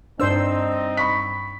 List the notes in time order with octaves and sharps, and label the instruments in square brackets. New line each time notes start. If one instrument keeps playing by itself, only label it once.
[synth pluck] G2 E6 [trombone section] C4 D#4 [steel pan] D4 C5
[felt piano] B5 C#6 B6